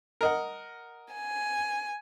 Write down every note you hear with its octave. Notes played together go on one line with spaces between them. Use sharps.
A#4 D#5 F#5
G#5